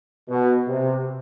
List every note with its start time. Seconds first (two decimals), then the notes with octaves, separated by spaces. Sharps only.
0.30 B2
0.68 C3